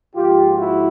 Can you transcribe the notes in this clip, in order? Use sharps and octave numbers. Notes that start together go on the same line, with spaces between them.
G#2 F3 A#3 F4 G4
E4 F#4